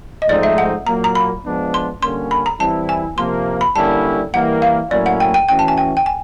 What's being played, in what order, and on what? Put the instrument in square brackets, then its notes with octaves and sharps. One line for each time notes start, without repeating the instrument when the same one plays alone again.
[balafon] D#5
[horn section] G#2 F3 A3 C4 D#4 [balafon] D5
[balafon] E5
F#5
[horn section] A#2 F#3 A#3 [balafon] A#5
[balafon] A#5
B5
[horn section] F3 G#3 B3 D4
[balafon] C6
[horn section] D3 G3 A#3 C#4 [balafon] C6
[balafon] B5
A#5
[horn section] E3 G3 C4 E4 [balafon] A5
[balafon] G#5
[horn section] C3 F3 A#3 [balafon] C6
[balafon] B5
[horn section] D3 G3 A#3 C#4 E4 [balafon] A5
[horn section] E3 G3 A#3 [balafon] F#5
[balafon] F5
[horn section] A2 F#3 A#3 C#4 E4 [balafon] D5
[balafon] F#5
G5
G5
[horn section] E3 A3 C#4 F#4 [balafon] G5
[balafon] A5
G#5
G5
G5
G#5